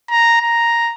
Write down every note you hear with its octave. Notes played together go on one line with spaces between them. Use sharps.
A#5
A#5